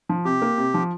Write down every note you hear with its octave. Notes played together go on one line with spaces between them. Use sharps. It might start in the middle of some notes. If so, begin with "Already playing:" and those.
F3
C3 G4
A#3
C3
F3